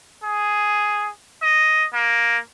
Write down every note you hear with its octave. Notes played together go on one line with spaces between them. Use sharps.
G#4
D#5
A#3